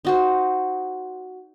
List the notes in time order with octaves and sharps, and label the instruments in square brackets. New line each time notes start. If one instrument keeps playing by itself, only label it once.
[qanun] D#4 F#4 C5